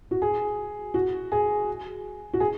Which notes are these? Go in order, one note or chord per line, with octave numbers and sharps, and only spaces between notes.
F#4
G#4
F#4
G#4
F#4
G#4